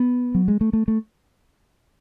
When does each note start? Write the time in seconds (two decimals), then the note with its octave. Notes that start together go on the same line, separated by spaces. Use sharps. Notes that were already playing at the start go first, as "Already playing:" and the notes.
Already playing: B3
0.35 F#3
0.48 G#3
0.61 A3
0.73 A3
0.88 A3